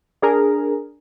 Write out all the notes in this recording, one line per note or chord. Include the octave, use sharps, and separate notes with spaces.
D4 G#4 A#4 A#5